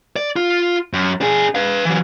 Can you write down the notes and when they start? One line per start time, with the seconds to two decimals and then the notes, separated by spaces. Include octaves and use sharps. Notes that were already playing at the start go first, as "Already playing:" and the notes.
0.16 D5
0.36 F4
0.93 F#2
1.21 D4 G#4
1.55 B4 F5
1.85 E3 F#3